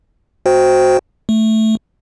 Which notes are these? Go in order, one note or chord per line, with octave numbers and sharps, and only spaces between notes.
F#4 C5 G5
A3